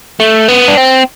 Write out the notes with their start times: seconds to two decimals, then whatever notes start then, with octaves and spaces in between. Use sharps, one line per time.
0.20 A3
0.48 B3
0.68 D4
0.77 C4